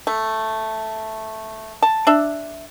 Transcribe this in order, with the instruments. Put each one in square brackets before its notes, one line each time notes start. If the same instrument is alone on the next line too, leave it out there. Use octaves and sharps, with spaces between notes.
[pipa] A3
A5
D4 E5